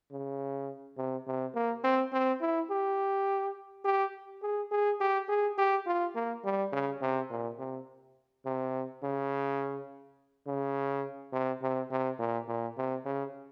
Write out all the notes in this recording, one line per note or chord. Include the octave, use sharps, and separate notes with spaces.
C#3
C3
C3
A#3
C4
C4
E4
G4
G4
G#4
G#4
G4
G#4
G4
F4
A#3
G3
C#3
C3
A#2
C3
C3
C#3
C#3
C3
C3
C3
A#2
A#2
C3
C#3